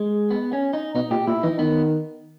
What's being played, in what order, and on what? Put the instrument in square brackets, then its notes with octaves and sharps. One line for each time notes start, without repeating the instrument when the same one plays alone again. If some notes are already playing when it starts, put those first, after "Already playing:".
Already playing: [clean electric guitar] G#3
B3
C#4
D#4
[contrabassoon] B2 [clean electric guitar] D#4
[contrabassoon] A#2 [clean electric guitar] G4
[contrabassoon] A#2 [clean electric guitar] E4
[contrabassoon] E3 [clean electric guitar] D#4
[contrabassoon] D#3 [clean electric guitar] B3